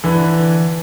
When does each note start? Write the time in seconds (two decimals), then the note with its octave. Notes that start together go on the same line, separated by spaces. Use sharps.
0.04 D3 E3